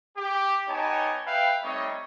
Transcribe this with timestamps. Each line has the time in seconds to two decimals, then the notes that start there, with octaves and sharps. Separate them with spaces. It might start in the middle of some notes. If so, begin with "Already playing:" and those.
0.17 G4
0.68 B3 D#4 G4 C#5 G#5 A5
1.26 B4 E5 F5 G5
1.62 G3 A3 C4 D#4 C#5 D#5